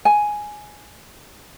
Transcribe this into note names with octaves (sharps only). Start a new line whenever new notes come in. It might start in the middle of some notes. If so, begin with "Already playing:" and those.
G#5